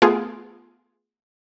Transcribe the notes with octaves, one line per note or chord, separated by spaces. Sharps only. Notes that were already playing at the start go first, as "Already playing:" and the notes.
A3 B3 F4 G#4